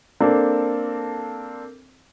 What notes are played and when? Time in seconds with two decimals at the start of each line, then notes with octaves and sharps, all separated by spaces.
0.21 A#3 C4 D4 A4